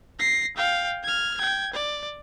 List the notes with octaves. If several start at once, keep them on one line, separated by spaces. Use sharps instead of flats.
A#6 C7
F5 G5
F6 G#6
G5 G#6
D5